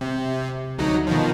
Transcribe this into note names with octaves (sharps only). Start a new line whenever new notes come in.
C3
D2 F#3 D#4
B2 D#3 F3